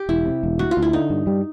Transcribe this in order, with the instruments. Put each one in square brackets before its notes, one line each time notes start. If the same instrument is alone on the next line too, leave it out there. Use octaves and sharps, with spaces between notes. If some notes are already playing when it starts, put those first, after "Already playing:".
Already playing: [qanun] G4
[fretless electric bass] E1 [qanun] E4
[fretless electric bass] C3
E1
[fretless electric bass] D2 [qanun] F#4
[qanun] F4
[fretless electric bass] D2
[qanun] E4
[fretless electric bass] D3 [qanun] D#4
[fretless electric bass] G2
G3